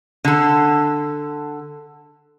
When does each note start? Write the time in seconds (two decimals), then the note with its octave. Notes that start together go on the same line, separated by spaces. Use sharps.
0.25 D3 A4